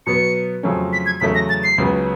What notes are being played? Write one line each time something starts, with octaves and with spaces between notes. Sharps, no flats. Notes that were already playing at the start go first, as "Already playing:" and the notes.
B2 F#3 B3 C#7
F2 C#3 F#3 A3 C#4
B6
G#6
E2 C#3 F#3 A3 B6
A#6
A6
C7
C#2 C#3 F#3 B3